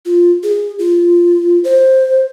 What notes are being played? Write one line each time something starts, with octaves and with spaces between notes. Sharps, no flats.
F4
G#4
F4
C5